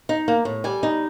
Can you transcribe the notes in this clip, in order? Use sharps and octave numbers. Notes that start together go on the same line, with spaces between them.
D#4
A#3
A2
G3 G#5
D#4